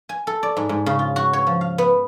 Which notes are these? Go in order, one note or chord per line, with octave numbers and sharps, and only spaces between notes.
G#5
A4
D5
G#2
G#2
C#3
F4
F#4
C#5
F3
F5
B3